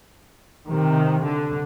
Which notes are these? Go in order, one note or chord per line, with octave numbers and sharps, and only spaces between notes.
C3 D#3
D3